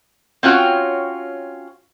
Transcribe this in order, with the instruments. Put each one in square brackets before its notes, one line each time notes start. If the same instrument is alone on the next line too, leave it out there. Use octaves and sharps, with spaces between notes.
[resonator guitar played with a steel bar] C4 C#4 F4 F#4 C#5 G5